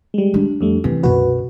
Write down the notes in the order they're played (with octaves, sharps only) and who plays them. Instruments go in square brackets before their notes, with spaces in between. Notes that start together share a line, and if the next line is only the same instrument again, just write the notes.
[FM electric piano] G3 G#3
[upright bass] D4
[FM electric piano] F2 G3 A3
[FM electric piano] C3 [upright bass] E3 C4
[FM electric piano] C2 F#4 B4 [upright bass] F#2 B2